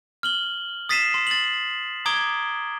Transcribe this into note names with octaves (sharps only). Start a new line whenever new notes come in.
F6 F#7 G7
D#6 A6 B6 C7 D#7 E7
C6
A6 F#7
A#5 D6 D#6 G#6 D7 G7